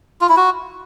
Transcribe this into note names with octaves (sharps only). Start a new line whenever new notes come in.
F4
E4
F#4